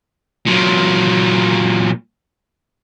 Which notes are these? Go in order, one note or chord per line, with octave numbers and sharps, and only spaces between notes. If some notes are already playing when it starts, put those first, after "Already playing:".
A#2 F#3